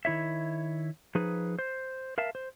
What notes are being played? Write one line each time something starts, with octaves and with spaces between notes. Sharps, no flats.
D#3 E4 C#5 E5
F3 D#4 G#4 B4
C5
A#4 E5 F5 A5
C5